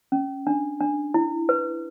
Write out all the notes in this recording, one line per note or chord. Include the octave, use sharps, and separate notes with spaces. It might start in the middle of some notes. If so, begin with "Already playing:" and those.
C#4
D4
D4
E4
B4